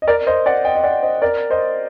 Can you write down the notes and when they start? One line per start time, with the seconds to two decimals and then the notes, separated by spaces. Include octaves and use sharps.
0.02 D#5
0.07 A#4 D5
0.27 C5 D#5
0.46 D5 F#5
0.65 D#5 G5
0.75 D#5
0.84 D5 F#5
1.03 C5 D#5
1.22 A#4 D5
1.51 C5 D#5